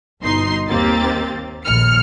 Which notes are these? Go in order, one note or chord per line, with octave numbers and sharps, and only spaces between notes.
G1 B2 D#4 C6 C7
D#2 D#3 A#3 C4 G4 A6
A#1 D#2 F6 C#7